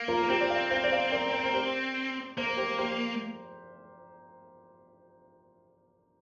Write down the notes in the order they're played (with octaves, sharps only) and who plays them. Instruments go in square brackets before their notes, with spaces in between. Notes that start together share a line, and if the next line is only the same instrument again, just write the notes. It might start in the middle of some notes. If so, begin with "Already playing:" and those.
Already playing: [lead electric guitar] A#3
[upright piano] F4 A#4
A#4
[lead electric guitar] C4 [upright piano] G4 C5
[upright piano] D5
C5 F5
C5 F5
D5
C5 F5
A#4 D5
C5
A#4
G4 C5
[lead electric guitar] A#3 [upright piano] C5
[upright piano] A#4
G4 C5
G4 C5